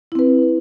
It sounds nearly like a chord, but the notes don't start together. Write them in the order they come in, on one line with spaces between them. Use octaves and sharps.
E4 C4 B4